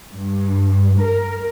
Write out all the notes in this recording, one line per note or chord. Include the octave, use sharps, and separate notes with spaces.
G2
A#4